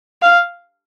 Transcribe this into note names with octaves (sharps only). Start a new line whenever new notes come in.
F5